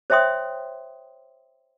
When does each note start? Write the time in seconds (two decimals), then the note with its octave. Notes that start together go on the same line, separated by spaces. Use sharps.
0.10 C5 C#5 E5 G5 C6 D#6